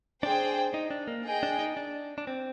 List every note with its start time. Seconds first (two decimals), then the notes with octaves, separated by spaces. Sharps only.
0.23 D4 G#4 C5 G5
0.74 D#4
0.91 D4
1.08 A#3
1.25 G#4 D#5 G5
1.43 D4
1.59 D#4
1.77 D4
2.18 D4
2.27 C4